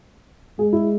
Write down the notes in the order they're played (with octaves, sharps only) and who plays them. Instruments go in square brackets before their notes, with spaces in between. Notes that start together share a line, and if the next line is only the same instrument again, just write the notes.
[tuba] G#3 [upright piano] G#4
[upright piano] E4